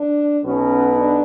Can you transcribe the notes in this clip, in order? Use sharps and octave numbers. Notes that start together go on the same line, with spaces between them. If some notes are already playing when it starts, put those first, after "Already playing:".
Already playing: D4
B1 B2 F#3 B3 C#4
D4